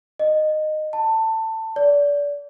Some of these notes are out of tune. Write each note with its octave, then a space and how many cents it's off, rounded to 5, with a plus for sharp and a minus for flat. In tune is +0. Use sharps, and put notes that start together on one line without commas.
D#5 -15
A5 +20
D5 -30